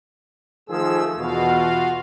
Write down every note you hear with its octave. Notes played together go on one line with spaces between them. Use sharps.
D#3 F3 A3 G#4 E6
E2 B2 F4 F#4 F5